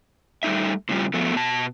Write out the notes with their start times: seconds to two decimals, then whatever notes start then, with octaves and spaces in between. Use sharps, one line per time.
0.43 G3 A3 D#4 E5
0.89 A2 C#3 G3 F4
1.14 F3 A3 B3
1.36 B2 A5